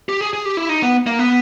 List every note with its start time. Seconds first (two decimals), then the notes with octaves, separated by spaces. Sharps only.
0.09 G4
0.21 G#4
0.33 G#4
0.45 G4
0.57 E4
0.69 D#4
0.83 B3
1.07 A#3
1.19 B3